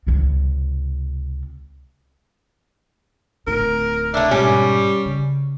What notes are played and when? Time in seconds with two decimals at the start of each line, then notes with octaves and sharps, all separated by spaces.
0.07 C#2 C3
3.47 D1 D#4 A#4
4.14 A3 D4 E4
4.31 G#2 B2 G3 C#4
5.05 C#3